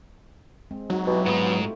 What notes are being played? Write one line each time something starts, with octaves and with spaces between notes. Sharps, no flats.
G#3 C4
F#3 D#4 F#4
B2 E4 G4
G#2 B3 F4
A3